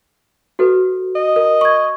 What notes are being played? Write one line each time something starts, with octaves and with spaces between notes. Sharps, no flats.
F#4 A4 B4
D#5
A#4
C#6 G#6